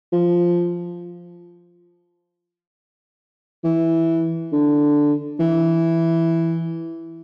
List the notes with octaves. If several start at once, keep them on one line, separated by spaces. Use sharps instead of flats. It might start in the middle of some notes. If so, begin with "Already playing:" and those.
F3
E3
D3
E3